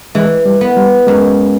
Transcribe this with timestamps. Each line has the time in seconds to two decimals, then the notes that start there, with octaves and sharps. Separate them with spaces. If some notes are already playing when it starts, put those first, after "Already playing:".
0.15 E3 G#3
0.45 G3
0.61 B3
0.77 G3
1.07 F#2 G#3